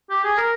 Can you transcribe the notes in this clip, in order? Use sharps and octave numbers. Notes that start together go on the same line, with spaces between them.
G4
G#4
A#4